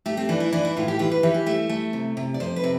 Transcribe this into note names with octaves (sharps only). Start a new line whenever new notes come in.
A3 G4
C4
E3 D4
E4
E3 D4
E4
A2 F4
G4
E3 F4
B4
E3 G4
G4
A3 E5
A3
C3
C3
D5
F2 C5
B4
C3